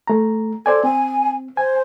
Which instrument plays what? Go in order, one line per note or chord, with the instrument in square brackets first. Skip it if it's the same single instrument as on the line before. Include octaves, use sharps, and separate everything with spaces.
[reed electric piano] A3 A#5
[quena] A4 [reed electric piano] C5 D5 G#5
[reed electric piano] C4 [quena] G#5
[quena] C5 [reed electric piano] G#5